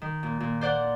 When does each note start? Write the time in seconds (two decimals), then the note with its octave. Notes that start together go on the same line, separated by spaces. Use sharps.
0.02 D#3
0.23 A#2
0.40 A#2
0.61 C5 D5 F#5